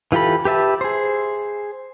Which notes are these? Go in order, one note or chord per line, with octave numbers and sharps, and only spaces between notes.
E3 F4 G4 A4 B5
G4 B4 E5 A5
G#4 C5